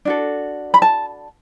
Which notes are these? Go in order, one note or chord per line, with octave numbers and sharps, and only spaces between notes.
D4 F#4 A4
B5
A5